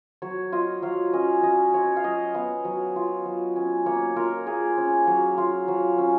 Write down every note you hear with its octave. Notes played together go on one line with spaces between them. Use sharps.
F#3 C#5
F4 D#5
F#3 F5
C#4 D#5
F#3 D#5
F4 C#5
F5
F#3 D#5
B3 F5
F#3
F4
F#3
C#4
A#3 C#5
F4 A#4
A#3 G#4
C#4
F#3
F4
F#3
C#4